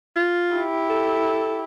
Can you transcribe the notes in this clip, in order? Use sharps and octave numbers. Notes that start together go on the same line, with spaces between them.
F4
E4 G4
A4